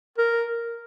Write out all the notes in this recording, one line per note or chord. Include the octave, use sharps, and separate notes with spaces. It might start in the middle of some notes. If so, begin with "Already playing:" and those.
A#4